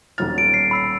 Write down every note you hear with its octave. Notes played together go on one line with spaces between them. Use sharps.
D#1 B1 F6 A6
D7
C7
B5 E6 C7